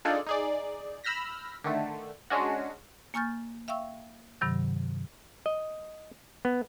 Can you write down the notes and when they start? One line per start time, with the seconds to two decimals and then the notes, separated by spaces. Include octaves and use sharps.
0.05 D4 D#4 F4 G#4 A4 D5
0.27 D#4 G#4 D5
1.04 B5 E6 F6 G6 A#6 B6
1.64 D3 D#3 A3
2.30 G#3 C#4 D4 F#4
3.14 A#3 G#5 C#6 F6 G6 A6
3.68 E5 F5 G5 C#6 E6
4.41 G2 C3 D#3 F#3
5.46 D#5
6.45 B3